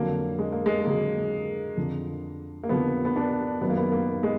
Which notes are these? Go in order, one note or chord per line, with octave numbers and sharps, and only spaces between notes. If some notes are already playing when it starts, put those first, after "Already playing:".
Already playing: F2 D3 F#3 A#3
G#3
A#3
G#3
F2 D3 F#3 A#3
F2 D3 F3
A#3
F2 D3 F3 B3
B3
D4
F#2 D#3 F#3 B3
A#3
B3
A#3
G#3